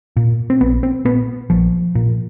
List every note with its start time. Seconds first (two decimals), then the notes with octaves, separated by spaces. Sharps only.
0.17 A#2
0.50 C4
0.61 A#1 B3
0.83 C4
1.05 A#2 B3
1.50 A#1 F3
1.95 A#2